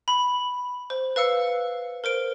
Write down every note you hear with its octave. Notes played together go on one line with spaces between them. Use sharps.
B5
C5
B4 F5 E6 C#7
A#4 C5 D7